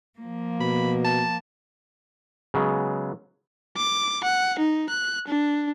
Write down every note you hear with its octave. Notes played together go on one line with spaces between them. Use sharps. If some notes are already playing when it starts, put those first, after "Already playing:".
F3 A#3
B2 B5
A5
C#3 F#3 G#3 B3
D6
F#5
D#4
F#6
D4